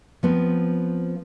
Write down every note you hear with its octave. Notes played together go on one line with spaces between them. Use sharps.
F3 B3 C4